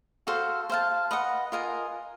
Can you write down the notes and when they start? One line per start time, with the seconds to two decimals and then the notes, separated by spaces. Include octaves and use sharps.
0.27 F#4 A4 C5 F5
0.70 C5 F5 A5
1.11 B4 D#5 F#5
1.52 F4 A#4 D#5 G#5